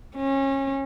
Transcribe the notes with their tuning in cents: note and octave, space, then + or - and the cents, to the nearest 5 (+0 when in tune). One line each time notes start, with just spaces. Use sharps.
C#4 -25